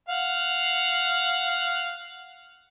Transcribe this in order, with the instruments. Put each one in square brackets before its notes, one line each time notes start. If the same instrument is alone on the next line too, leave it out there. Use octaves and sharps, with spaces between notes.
[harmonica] F5 F#5